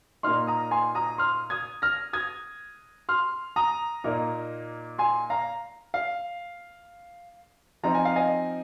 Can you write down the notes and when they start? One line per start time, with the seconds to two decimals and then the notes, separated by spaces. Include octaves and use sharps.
0.23 A#2 A#3 D#4 C6 F6
0.47 A#5 D#6
0.71 G#5 C6
0.95 A#5 D#6
1.18 C6 F6
1.50 D#6 G#6
1.82 F6 A#6
2.13 D#6 G#6
3.09 C6 F6
3.56 A#5 D#6
4.04 A#2 A#3 D#4
4.99 G#5 C6
5.30 F5 A#5
5.94 F5
7.83 F3 C4 D#4 A#5
7.94 G#5
8.05 F5
8.16 D#5 G#5